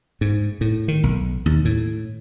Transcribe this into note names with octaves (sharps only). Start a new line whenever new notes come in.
G#2
A2
D#3
B1
D#2
A2